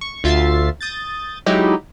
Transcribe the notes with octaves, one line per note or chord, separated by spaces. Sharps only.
C#6
D2 F4 E5 A6 C7
D#6 G6 A6
F#3 G#3 D#4 E4 G4